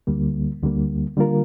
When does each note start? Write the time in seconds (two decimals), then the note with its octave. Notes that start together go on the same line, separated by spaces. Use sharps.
0.07 D2 D3 G3 A#3
0.62 D2 D3 G3 A#3
1.17 D3 G3 A#3 F4 A#4